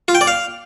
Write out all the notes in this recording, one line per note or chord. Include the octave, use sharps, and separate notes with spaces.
F4
G5
D5
F5